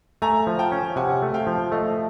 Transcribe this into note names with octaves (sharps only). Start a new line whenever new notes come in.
A3 G#5 A#5
F3
G5 A5
C#4
C3 F#5 G#5
A3
F5 G5
F3
A3 D#5 F5